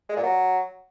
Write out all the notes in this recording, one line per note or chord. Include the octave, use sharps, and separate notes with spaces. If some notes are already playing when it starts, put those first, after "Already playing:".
G#3
A#2
F#3